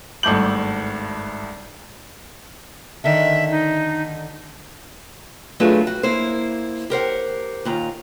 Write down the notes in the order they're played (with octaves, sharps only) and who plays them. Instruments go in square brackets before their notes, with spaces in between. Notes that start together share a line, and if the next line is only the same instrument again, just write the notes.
[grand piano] G#1 G2 A3 D6 G6 F#7
[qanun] D3 D#3 [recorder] E5
[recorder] D#4
[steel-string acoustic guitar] F#3 A3 D4 F4 G#4 B4
F#4
A#3 E4 C5
G4 A#4 C5 F#5
D#2 A#2 A#5